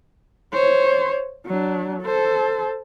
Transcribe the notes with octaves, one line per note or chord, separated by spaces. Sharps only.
C5 C#5
F#3 D4
A4 C5